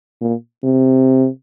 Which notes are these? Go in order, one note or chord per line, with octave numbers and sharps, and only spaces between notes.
A#2
C3